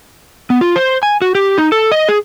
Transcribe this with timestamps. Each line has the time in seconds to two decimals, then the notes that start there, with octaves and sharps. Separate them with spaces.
0.50 B3
0.61 F4
0.76 C5
1.03 G#5
1.22 F#4
1.35 G4
1.58 D#4
1.72 A4
1.91 D#5
2.08 G#4